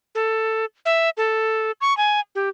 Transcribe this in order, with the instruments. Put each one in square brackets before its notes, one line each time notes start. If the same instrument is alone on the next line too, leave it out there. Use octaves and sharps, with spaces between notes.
[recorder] A4
E5
A4
C#6
G#5
G4